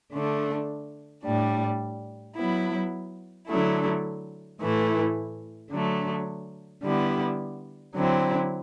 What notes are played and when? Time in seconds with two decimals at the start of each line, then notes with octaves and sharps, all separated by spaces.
0.12 D3 A3 D4
1.23 A2 G3 D4
2.35 F#3 B3 E4
3.47 D3 F#3 A3 E4
4.59 A2 E3 A3 E4
5.70 D3 F#3 A3
6.82 D3 G3 B3 E4
7.95 D3 F#3 C4 E4